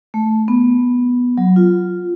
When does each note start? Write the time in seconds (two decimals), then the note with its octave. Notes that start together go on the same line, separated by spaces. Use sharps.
0.14 A3
0.48 B3
1.37 F#3
1.56 F4